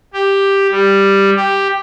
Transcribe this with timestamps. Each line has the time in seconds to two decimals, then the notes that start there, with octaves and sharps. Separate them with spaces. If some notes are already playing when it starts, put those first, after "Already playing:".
0.13 G4
0.71 G3
1.37 G4